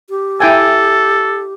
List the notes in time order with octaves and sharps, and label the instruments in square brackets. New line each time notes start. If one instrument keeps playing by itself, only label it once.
[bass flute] G4
[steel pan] E4 G5 G#5 [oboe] A4